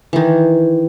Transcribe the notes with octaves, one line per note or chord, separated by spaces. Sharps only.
D#3 E3